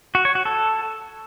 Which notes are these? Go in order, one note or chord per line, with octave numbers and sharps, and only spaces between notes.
F#4
C#5
F#4
A4